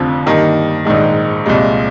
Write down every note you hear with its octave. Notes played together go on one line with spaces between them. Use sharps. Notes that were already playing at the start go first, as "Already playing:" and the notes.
Already playing: F1 F2 D3 F3
G2 D#3 A#3
A#1 G#2 D#3 G#3
C2 A#2 G#3